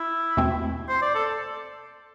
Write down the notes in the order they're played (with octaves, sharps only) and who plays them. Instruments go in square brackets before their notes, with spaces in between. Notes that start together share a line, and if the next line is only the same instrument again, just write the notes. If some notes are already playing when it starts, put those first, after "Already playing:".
Already playing: [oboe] E4
[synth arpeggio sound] E2 B2 A3 C4 G4
[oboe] C5
D5
A4